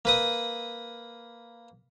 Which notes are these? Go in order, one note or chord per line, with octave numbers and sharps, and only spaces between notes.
A#3 B4 D#6